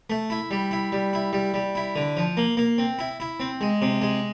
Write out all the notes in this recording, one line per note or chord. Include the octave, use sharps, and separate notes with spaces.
A3
E4
G3
E4
G3
E4
G3
G3
E4
D3
F3
A#3
A#3
C4
E4
E4
C4
G#3
C3
G#3